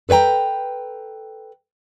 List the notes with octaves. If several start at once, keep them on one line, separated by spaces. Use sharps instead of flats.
A4 B4 C#5 G5 A#5